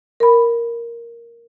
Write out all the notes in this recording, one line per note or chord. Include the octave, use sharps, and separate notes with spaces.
A#4 B5